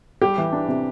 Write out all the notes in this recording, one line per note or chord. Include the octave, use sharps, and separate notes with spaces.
G3 G4
E3
D4
C3